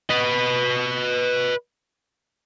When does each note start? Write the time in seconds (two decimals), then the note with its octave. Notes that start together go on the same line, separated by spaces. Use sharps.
0.10 B4 D#5